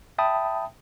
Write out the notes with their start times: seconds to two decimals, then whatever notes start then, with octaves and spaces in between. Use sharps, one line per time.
0.18 E5 G5 A5 B5 D#6